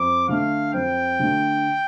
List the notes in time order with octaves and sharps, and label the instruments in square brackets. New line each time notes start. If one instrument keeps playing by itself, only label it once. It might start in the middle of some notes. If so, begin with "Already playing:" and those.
Already playing: [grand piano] F2 [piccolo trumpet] D6
[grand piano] D3 A3 [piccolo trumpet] F5
[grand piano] F2 [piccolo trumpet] G5
[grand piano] D3 A3